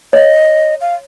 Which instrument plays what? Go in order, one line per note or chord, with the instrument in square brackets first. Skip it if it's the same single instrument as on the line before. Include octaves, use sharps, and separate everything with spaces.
[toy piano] C#5 [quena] D#5
[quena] F5